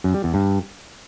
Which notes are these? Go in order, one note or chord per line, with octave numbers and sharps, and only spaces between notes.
F#2
G3
E2
G2